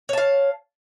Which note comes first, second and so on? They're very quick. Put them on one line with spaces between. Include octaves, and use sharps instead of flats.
C#5 A5 F5